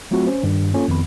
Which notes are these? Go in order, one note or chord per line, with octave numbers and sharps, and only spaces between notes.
F#3 A3 C4 F4 F#4
C#4 C5
G2 D#3
A#3 C#4 F4 A4
F2 D#3 B3 B5